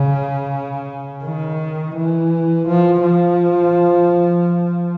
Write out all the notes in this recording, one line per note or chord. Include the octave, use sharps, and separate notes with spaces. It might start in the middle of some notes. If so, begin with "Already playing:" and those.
Already playing: C#3
D#3
E3
F3
F3